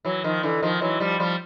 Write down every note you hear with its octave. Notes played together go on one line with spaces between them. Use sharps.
E3 F#3
D#3 F3
D3 E3
D#3 F3
E3 F#3
F3 G3
F3 G3